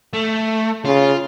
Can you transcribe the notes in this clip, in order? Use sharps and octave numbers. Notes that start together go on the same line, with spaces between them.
A3
C#3 F4